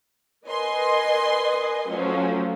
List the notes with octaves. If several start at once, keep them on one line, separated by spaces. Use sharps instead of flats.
A#4 B4 D#5 G#5 C6
F3 F#3 A3 C#4